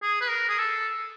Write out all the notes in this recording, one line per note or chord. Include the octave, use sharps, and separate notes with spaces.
G#4
B4
A#4
G#4
A4